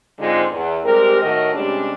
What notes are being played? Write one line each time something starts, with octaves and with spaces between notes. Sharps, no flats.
G#2 D3 G#3 C4 D#4 F4
E2
G3 G#3 C4 G4 A#4
A2 D#3 A3 F#4 A#4 D#5
C3 G3 G#3 C#4 D4